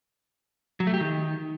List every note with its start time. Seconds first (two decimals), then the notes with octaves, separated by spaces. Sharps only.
0.80 F#3
0.87 A3
0.94 G4
1.00 D#3